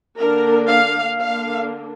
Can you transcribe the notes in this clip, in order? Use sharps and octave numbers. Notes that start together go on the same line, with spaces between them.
D3 A#3 D4 A#4
F5
D3 A#3 D4 F5